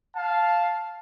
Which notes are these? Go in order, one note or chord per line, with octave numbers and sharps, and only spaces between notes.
F5 A5